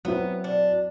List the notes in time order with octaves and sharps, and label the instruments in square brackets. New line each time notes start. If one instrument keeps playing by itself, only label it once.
[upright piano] F#3 C4 E4 [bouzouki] B3
[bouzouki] D4